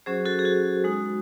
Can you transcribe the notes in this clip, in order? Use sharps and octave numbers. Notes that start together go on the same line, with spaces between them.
F#3 C#4 F#4 G#4 C5
F#4 A4
G#4
F#4
G#3 D#4 F#4